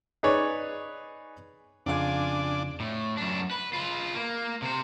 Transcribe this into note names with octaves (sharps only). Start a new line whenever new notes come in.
D#4 G#4 B4 C#5 D5
F2 C#3 D4 F4 G#5 D6
A2
F#2 D4
B4
F4 B4
A#3
C3 C5